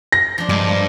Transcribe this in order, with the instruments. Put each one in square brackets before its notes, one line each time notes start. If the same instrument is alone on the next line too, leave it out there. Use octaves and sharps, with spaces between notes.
[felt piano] A#6
[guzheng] F3 D4
[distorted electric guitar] G2 [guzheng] G#3 A#3